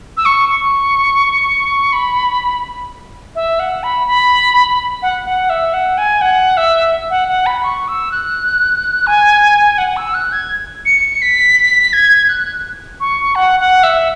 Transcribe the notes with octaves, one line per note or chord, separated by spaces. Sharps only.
E6
C#6
C#6
B5
E5
F#5
B5
B5
F#5
F#5
E5
F#5
G#5
F#5
E5
F#5
F#5
B5
C#6
E6
F#6
G#5
F#5
E6
F#6
G#6
C#7
B6
G#6
F#6
C#6
F#5
F#5
E5